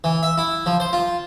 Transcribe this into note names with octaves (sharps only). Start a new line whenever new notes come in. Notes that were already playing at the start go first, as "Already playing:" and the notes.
E3
E5
E4
F3
C5
F4